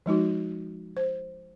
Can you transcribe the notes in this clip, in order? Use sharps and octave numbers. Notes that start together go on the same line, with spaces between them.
F3 G#3 D#4 F#4
C5